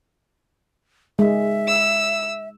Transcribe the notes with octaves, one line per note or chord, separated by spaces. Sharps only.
G#3 E5
E6